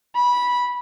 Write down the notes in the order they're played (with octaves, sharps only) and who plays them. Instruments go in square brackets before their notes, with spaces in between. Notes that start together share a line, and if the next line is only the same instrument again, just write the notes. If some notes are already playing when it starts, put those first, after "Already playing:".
[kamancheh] B5